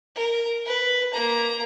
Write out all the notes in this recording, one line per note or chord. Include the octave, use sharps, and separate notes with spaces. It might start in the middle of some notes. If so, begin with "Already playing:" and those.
A#4
B4
A#3 A#5